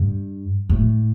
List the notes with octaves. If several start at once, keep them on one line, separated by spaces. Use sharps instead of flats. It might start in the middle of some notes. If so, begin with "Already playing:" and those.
Already playing: G2
A2